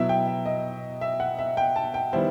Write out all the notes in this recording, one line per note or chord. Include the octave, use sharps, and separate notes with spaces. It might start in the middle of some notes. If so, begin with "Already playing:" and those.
Already playing: B2 F#3 B3 E4 E5
G5
E5
D#5
E5
F#5
E5
G5
A5
G5
D#3 G3 B3 E4 C5